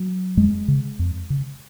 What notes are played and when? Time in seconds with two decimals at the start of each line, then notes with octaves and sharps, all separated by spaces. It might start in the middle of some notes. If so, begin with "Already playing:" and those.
Already playing: F#3
0.37 F2 G#3
0.68 C#3
0.99 F2
1.30 C#3